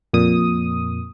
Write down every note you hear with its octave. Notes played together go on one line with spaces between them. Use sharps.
F2 A#2 D#6